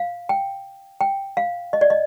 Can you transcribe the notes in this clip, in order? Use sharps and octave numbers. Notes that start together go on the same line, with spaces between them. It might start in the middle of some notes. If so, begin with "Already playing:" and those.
Already playing: F5
G5
G5
F5
D#5
D5
D#5